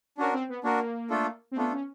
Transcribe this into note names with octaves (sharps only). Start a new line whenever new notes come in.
C#4 D4 F#4 A#4
C4
B3
A#3 D4 F#4 A#4
A3 D4 F4 A4
C4
A3 B3 D4 F4 A4
C#4